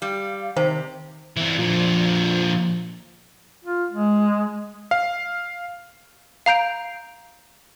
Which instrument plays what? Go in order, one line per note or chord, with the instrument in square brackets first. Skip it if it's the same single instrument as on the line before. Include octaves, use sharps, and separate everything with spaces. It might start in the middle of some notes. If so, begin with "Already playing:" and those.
[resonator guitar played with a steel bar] G3 [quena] F5
[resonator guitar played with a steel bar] C3 [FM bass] D#3 [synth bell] C5
[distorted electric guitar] E3 C4
[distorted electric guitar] A#2 D3 [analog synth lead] F3
[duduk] F4
G#3
[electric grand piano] F5
[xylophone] F5 A#5 G6 D7